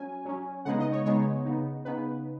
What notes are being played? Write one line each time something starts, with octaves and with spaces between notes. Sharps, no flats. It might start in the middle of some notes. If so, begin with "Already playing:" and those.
Already playing: F#3 C#4 G#5
F#3 C#4
C#3 G#3 B3 D#4 F#5
D#5
C#5
C#3 G#3 B3 D#4 C#5
C#3 B3 D#4
C#3 B3 D#4 B4